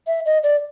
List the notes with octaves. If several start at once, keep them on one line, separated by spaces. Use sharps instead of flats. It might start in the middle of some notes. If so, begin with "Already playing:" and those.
E5
D#5
D5